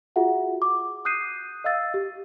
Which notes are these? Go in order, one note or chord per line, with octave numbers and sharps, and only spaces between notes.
F4 F#4 G#4 E5 F#5
D6
D#6 F#6 G6 C7 D#7
D#5 F5 E6 A6
G4